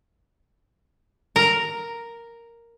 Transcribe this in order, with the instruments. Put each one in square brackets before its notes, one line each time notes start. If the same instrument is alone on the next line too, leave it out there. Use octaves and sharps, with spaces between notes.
[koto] A#4